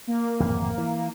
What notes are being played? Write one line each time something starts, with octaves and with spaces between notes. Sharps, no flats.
A#3
D1 G#1 F2
E3